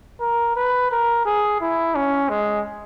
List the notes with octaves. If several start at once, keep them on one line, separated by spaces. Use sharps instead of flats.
A#4
B4
A#4
G#4
E4
C#4
G#3